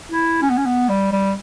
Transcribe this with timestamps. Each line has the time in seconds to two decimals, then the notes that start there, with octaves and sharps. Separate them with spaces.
0.12 E4
0.42 C#4
0.50 B3
0.58 C#4
0.66 B3
0.89 G3
1.12 G3